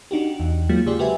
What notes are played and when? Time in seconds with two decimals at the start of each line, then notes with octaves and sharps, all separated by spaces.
0.11 D4 D#4 F#4 G4
0.40 E2
0.69 F#3 G#3 A#3 F4
0.86 C#3 F4 G4 G#4 D5 C6
0.99 F#4 G4 B4 C5 E5 G#5